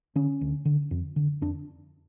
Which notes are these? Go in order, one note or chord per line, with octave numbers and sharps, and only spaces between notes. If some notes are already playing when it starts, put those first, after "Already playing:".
D3 C#4
D2
D3
F2
D3
F2 D4